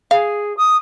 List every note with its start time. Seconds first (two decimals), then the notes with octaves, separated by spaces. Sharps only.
0.11 G#4 F5
0.57 D#6